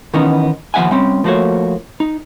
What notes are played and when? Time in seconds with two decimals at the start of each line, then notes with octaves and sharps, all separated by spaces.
0.14 D#3 E3 B3 C#4 D#4
0.74 D#2 F3 C#4 E5 F#5 G#5
0.91 G3 C4 C#4
1.24 F3 A3 A#3 F#4 C5 C#5
2.00 D#4